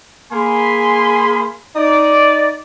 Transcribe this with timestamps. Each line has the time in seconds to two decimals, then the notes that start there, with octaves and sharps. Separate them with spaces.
0.32 A#3 G#4 G#5 B5 C6
1.76 D#4 D5